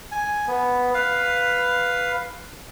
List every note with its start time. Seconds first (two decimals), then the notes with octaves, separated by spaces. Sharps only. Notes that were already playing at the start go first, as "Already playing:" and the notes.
0.12 G#5
0.48 B3
0.94 B4 F5